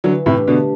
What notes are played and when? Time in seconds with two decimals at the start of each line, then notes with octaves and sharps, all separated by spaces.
0.04 D3 E3 F#3
0.26 A2 C3
0.37 A3 D4 G4
0.48 B2 D3